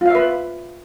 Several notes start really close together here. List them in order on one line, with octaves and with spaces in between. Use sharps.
F4 F5 E5 B4